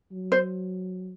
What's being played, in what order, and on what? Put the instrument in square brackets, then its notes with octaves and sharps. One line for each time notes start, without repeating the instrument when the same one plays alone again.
[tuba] F#3
[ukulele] C5